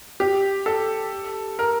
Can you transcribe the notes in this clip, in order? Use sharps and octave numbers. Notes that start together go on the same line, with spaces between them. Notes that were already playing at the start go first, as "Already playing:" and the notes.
G4
A4
A#4